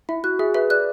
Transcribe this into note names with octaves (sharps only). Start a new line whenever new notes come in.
E4 E5
F#4 F#6
G#4 E5
B4 E5
D5 F#6